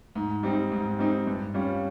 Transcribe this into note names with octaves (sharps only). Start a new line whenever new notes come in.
G#2
G3 C4 D#4
G#2
G3 C4 D#4
G2
G3 C#4 F4